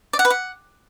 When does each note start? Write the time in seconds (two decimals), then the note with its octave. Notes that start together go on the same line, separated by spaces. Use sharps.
0.13 D5
0.19 F#5
0.25 B4
0.30 F#5